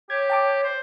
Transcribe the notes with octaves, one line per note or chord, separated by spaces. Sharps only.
G4 C#5 G#6
G5 A5 D6
C5